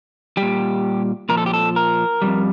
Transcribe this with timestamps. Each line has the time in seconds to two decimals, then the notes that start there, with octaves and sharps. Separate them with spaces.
0.37 G3 G4
0.42 A#2
1.29 A#2 F3 A#4
1.37 A4
1.46 G4
1.54 A4
1.76 A#4
2.22 C3 G3
2.26 F2